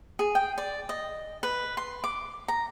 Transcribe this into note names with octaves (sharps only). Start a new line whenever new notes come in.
G#4
G5
D5
D#5
B4
C6
D6
A#5